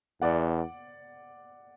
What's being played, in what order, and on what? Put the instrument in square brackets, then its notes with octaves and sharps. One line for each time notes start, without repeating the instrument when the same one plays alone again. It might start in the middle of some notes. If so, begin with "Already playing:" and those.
[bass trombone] E2 [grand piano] D5 F#5